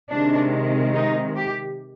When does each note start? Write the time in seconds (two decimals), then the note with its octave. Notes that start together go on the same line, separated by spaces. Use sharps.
0.11 C3 D#3 G#3 D4
0.95 D#4
1.36 G4